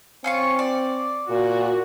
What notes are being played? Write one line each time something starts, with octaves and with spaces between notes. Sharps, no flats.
C4 C#4 F4 C#6
D5
A#2 F#4